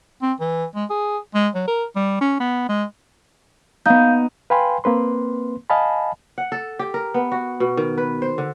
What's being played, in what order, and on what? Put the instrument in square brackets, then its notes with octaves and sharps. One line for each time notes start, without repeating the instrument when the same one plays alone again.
[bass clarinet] C4
E3
G#3
G#4
G#3
F#3
A#4
G3
C#4
B3
G#3
[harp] B3 D#4 [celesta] F5 G6
[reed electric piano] B4 F5 G5 G#5 B5 C6
A#3 C4 B4 C6
D#5 F5 G#5 A5 B5
[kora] F#5
A4
G4
A#4
B3
F#4
B2
D#3
B4
C5
D3